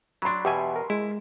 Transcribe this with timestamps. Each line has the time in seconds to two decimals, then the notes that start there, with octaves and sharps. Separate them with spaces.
0.22 F#3 D4 B5 C6
0.45 E2 B2 G4 E5 G#5
0.76 A#4
0.90 G#3 E4